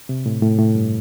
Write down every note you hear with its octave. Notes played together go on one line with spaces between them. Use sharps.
C3
A2
A2
A2
G2